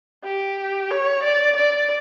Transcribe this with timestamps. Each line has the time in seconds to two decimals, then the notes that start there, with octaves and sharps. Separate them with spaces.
0.24 G4
0.91 C#5
1.23 D5
1.56 D5